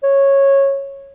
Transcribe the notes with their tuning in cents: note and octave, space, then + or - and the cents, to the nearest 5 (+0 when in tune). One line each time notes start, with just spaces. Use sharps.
C#5 -10